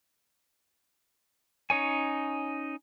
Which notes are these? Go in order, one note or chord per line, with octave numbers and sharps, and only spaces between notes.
C#4 D#4 C#5 G#5